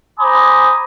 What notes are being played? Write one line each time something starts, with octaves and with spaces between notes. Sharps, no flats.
C5 G#5 A#5 B5 D6 D#6